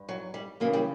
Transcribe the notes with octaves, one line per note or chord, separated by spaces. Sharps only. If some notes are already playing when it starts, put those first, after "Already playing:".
Already playing: G2
F#3
G3
F#2 C#3 E3 F#3 A#3
G3